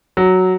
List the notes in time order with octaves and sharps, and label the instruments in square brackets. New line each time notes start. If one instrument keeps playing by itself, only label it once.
[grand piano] F#3